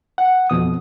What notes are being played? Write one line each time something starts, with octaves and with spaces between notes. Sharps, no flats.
F#5
F2 B2 D#6